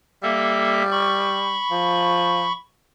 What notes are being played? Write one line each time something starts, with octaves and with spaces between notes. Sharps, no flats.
G3 A#3 A4 E5
B5 C#6
F3